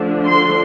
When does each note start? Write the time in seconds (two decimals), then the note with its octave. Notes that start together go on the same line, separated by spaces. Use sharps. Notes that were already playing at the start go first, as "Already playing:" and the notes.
Already playing: D3 F3 A3 D4
0.26 C6